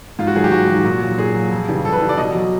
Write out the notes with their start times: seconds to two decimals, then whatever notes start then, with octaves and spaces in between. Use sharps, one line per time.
0.19 G#2 F4
0.27 F#4
0.36 D#3 F#3 G#4
0.44 G4
0.52 G#2 F#4
0.69 D#3 F#3
0.85 A#2
1.02 F#3
1.18 A#2 G#4
1.35 F#3
1.51 F2
1.68 C#3 E3 G3
1.85 F2 A4
1.93 B4
2.02 C#3 E3 G3
2.09 D5
2.17 B2 D#5
2.35 F#3